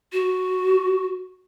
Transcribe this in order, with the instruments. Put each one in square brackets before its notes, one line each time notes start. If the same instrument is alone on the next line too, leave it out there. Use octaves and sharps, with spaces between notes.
[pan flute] F#4